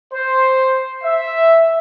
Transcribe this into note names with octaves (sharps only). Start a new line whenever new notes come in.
C5
E5